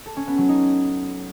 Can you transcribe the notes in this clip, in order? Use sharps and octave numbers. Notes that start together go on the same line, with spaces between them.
A4
C#4
B3
F#3
D#4